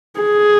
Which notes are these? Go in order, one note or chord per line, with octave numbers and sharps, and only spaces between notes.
G#4